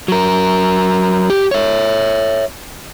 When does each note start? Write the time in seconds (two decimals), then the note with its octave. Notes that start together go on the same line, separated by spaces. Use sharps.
0.08 F#3 A#4
1.30 G4
1.51 C#5 E5